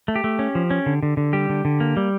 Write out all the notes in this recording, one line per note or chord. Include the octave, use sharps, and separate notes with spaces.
A3
G4
A3
C#4
F3
C#4
D3
D3
D3
G3 G4
D3
D3
A#3
G3